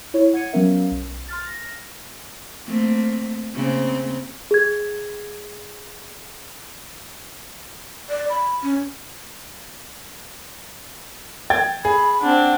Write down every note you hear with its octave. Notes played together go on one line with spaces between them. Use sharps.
E4 C#5
F#5 G#6 C#7 D#7
F#3 B3 C#4 A#4 E5 F5
B1
C6 F6 A6
F6 A#6
A3 A#3 C4
C#3 A#3 C4
G#4 G#6
D5
B5
C#4
G5 G#6 A6
G#4 B5
C4 D4 F#5